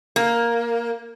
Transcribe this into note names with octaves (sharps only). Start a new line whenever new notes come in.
A#3